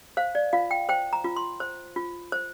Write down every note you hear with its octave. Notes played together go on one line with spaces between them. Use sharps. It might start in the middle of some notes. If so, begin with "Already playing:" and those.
C5 F5
D5
F4 F5
G5
C5 G5
A#5
F4
C6
C5
F4
C5